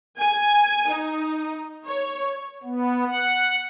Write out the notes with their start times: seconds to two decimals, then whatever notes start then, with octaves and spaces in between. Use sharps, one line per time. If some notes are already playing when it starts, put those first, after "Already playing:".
0.19 G#5
0.90 D#4
1.86 C#5
2.64 B3
3.06 F#5